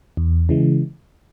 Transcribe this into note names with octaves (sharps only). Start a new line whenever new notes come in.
E2
C#3 E3 G#3